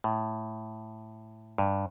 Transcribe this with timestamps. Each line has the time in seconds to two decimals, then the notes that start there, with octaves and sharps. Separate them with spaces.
0.04 A2
1.58 G2